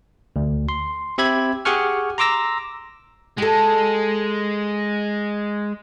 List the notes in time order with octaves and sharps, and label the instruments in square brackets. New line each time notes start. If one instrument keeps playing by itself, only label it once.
[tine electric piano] D2
C6
C4 G4 E5 B5 G#6
G4 G#4 F#5 G#5 C#6 F6
A#5 C6 D6 E6 A#6
[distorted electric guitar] G#3 [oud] G4 A4